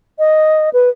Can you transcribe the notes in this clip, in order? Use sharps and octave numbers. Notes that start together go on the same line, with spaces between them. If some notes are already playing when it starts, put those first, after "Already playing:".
D#5
B4